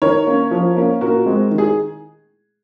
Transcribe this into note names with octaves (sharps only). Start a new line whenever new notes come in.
D#3 A#4 C#5
A#3 C#4
F3
A#3 C#4
A#2 F#4 A#4
G#3 C4
D#3
G#4